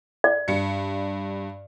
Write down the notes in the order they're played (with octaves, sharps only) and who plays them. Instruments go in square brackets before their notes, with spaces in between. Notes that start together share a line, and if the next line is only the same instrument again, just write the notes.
[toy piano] D5
[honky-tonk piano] G2 C#7